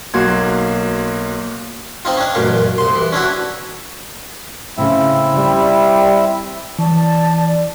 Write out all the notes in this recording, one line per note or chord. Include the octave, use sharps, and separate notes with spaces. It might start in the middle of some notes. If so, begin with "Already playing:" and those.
B1 A#3 F#4 C6 G#6
C4 D#4 F4
C#4 D4
A1 F#2 A#2 F5
C2 C6
E3
C#4 D4 E4 F#4
A2 C#3 C4 E4 E5
G3 G4
E3 D5 A5